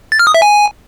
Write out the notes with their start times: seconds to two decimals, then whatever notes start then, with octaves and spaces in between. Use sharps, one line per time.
0.12 A6
0.19 F6
0.27 D#6
0.34 E5
0.42 G#5